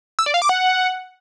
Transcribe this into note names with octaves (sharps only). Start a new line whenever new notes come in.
E6
D5
F5
D6
F#5